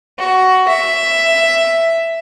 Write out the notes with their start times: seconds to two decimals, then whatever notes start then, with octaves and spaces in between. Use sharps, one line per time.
0.19 F#4
0.68 E5